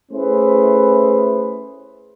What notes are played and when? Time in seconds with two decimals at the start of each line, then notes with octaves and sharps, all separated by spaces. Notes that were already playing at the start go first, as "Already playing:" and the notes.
0.12 A3 C#4 E4 G#4 B4 C5